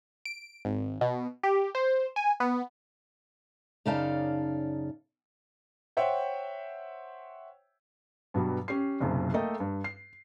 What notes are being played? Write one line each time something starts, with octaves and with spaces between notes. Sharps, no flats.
D7
G#1
B2
G4
C5
G#5
B3
F#2 C#3 D#4 D5 F5 A5
C5 C#5 E5 F#5 G5
G2 B2 F#3 G3
C#4 G4 C7
F#1 B1 F#2 C3
A3 A#3 A4 D#5 G5
G2
C7